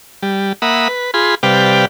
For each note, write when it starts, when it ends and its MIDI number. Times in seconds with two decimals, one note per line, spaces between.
0.23 0.53 55
0.62 0.88 58
0.62 0.88 76
0.62 0.88 78
0.62 0.88 83
0.62 0.88 87
0.88 1.11 71
1.14 1.35 65
1.14 1.35 68
1.14 1.35 83
1.14 1.35 84
1.43 1.85 48
1.43 1.85 55
1.43 1.85 71
1.43 1.85 74
1.43 1.85 77
1.43 1.85 79